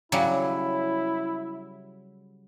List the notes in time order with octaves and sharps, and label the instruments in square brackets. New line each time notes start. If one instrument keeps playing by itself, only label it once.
[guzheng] C#3 F#3 G3 [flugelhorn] E4